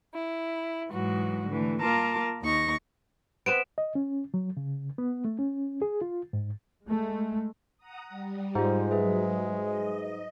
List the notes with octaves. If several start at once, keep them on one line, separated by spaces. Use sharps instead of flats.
E4
G#2 E3 F#3 G#3 F#4
D3 E3 A3
A#3 F4 A#4 A5 A#5 D6
D#2 D#4 C#6 A#6
B3 C4 B4 D7 E7
D#5
C#4
F#3
C#3
B3
A3
C#4
G#4
F4
G#2
G#3 A3
F#5 A#5 D#6
G3
G#2 G#3 F4 G4 C5
F#3 G#4 B4 E5
D#5